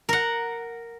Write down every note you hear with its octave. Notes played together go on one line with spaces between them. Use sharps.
A#4 F#5